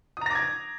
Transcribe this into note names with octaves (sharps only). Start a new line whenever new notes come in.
A#5 D6 D#6 G#6 A#6